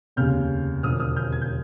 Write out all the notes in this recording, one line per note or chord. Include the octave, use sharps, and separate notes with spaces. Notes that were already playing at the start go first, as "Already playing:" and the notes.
F1 D#2 C#3 F6 G6
E1 D2 D3 F3 D#6 F6
D#6 F6
F6 G6
G#6
G6